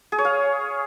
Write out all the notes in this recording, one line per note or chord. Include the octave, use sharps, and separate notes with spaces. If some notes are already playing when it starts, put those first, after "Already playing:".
G#4
C#5
F5